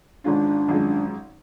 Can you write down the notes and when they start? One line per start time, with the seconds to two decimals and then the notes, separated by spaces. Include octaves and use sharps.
0.24 G#1 G#2 G#3 C#4 D4 F4
0.68 G#1 F#2 F3 G#3